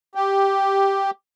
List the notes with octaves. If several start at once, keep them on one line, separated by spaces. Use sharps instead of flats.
G4